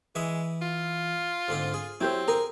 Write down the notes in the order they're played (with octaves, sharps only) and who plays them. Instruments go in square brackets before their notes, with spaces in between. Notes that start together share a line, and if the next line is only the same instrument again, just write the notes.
[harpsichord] E3 E5 D#6 [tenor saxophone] G#3
[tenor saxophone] F4
[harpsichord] G#2 D3 C4
G#4
[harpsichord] F#3 [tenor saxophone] C4 [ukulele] E4 G4 C5
[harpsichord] G#4 G#5 [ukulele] A#4